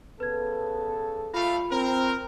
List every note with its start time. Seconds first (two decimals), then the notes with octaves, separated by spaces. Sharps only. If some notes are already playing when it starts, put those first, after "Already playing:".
0.20 C#3 B3 A4 B4 G#6
1.34 G3 A3 F4 F5 B5
1.71 C4 A#4